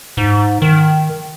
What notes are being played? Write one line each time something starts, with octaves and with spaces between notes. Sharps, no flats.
G#2
D#3